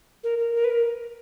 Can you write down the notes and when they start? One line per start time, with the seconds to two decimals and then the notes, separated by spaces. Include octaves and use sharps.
0.24 A#4
0.39 A#4
0.54 A#4
0.64 B4
0.70 A#4